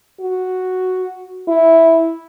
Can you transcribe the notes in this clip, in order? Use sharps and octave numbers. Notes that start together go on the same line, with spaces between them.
F#4
E4